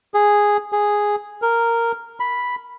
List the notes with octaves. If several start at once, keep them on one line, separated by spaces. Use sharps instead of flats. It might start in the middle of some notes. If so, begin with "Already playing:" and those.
G#4
G#4
A#4
B5